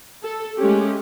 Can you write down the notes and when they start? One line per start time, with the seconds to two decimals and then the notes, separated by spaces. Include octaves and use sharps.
0.23 A4
0.59 G#3 A3 C#4 G4